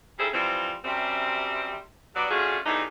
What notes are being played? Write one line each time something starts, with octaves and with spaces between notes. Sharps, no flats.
G3 D#4 E4 G#4 A4 C5
E3 F3 G3 C4
F#2 C3 G3 C4
G2 F#3 B3 D5
A3 C#4 D4 F4 F#4 G#4
E2 A2 C3 D4 D#4